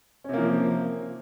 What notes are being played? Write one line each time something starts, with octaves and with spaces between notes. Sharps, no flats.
C3 F3 A#3 C#4